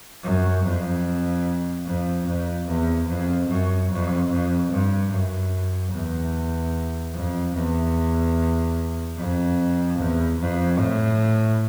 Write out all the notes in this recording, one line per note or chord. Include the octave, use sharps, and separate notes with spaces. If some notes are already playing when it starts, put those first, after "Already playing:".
F#2
F2
F2
F2
E2
F2
F#2
F2
F2
G2
F#2
E2
F2
E2
F2
E2
F2
A2